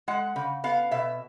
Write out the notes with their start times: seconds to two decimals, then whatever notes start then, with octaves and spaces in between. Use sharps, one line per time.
0.08 G#3 F#5
0.36 C#3
0.64 B3 F5
0.91 B2 E5